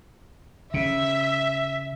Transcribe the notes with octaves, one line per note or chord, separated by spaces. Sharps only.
C#3 E5